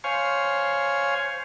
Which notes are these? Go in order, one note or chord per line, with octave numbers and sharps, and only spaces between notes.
C5 C#5 F5 G#5